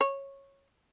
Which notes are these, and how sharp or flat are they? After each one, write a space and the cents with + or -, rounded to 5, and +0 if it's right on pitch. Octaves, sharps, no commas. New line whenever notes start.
C#5 -10